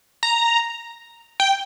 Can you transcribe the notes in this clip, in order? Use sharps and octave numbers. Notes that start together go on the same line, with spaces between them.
A#5
G5